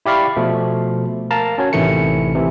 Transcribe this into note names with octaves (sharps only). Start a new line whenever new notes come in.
E4 G4 D5 F5 B5 C#6
B2 F3 A3
A#4 F5 A5 A#5
C#4 F#4 C#5
A1 C3 D#3 E3 A3 C#7
C3 E3